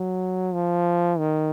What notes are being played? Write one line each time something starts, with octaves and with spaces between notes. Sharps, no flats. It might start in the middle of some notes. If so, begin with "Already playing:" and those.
Already playing: F#3
F3
D#3